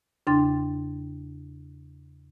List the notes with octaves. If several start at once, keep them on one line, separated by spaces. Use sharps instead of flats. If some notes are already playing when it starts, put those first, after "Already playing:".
E2 C#3 D4 G5 C6 A6